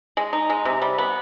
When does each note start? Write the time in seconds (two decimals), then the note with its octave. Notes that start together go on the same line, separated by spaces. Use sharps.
0.17 G#3
0.33 D#4
0.50 G#3
0.65 C3
0.82 G3
0.98 B3